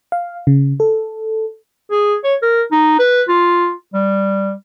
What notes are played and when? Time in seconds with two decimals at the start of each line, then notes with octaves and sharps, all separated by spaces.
0.12 F5
0.47 C#3
0.80 A4
1.91 G#4
2.24 C#5
2.42 A#4
2.71 D#4
2.99 B4
3.28 F4
3.94 G3